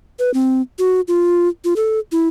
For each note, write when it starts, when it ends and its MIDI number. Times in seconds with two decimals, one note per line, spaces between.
0.19 0.31 71
0.34 0.62 60
0.79 1.01 66
1.08 1.48 65
1.64 1.74 65
1.76 1.99 69
2.12 2.28 64